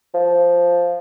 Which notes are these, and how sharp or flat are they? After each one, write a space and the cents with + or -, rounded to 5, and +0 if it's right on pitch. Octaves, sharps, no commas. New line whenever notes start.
F3 +0